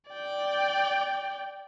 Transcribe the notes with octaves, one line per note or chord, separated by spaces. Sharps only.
D5 G5